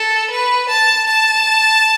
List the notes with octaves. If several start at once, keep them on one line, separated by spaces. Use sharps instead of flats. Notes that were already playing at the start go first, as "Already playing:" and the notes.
Already playing: A4
B4
A5
A5